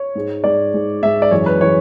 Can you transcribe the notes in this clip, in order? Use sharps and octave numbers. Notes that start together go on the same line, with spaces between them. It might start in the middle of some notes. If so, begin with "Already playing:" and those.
Already playing: C#5
G#2 G#3
G#2 G#3 D5
G#2 G#3
G#2 G#3 E5
D5
F#2 E3 G#3 C#5
B4
E3 G#3 C#5